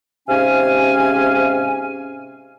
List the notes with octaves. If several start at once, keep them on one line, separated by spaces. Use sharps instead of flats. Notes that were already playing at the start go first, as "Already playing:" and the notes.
G#2 C3 C#4 F5 G#5